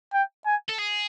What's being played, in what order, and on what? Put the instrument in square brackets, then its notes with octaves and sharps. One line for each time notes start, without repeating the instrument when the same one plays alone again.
[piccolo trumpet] G5
G#5
[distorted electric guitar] A4
G#4